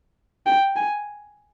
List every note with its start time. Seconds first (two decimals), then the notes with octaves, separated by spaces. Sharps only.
0.46 G5
0.76 G#5